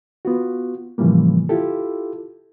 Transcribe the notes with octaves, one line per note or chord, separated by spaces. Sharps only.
B3 F4 F#4
A2 C#3 E3 F3 G3 A#3
E4 F4 G4 A4